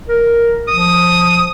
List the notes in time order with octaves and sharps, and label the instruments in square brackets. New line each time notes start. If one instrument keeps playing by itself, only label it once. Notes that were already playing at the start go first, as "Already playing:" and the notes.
[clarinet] A#4
[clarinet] F3 [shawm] D#6